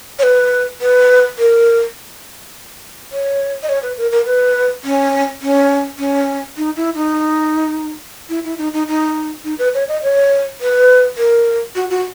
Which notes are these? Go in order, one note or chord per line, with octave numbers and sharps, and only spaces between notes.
C#5
B4
B4
A#4
C#5
D#5
C#5
B4
A#4
A#4
B4
C#4
C#4
C#4
D#4
E4
D#4
E4
E4
D#4
D#4
D#4
D#4
B4
C#5
D#5
C#5
B4
A#4
F#4
F#4